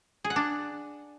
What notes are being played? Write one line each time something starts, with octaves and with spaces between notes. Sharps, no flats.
G#4
F#5
D4